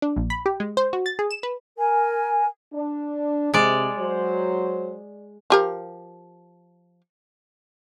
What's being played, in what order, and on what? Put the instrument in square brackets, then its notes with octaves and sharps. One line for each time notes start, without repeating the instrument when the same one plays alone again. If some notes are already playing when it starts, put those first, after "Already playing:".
[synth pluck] D4
A#1
B5
G4
G#3
C5
F#4
A6
G#4
E7
B4
[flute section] A#4 G#5
[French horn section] D4
[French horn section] C3 [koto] G#3 D5
[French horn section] F#3 C5
[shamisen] F3 G4 A#4